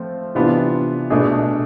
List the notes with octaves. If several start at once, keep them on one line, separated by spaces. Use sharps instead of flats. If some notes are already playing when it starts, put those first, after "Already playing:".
Already playing: F3 A3 C4
C3 E3 B3 D4 F4
B2 A3 D4 G#4